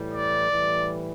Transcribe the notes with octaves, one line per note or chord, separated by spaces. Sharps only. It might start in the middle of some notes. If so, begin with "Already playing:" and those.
Already playing: A2 E3 G3
D5
A2 E3 G3